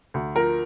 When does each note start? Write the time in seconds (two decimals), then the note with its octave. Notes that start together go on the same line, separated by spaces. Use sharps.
0.14 D2
0.36 F3 A#4